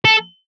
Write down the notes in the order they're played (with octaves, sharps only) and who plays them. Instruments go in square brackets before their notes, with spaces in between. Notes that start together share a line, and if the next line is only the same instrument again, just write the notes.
[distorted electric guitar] A4